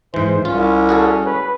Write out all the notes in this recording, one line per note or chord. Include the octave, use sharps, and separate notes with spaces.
G#2 E3 C5
C2 C#4 F4
F#4 G#4 A4
B4